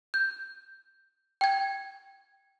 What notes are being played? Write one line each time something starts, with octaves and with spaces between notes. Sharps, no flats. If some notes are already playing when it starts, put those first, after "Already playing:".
G6
G5 G#6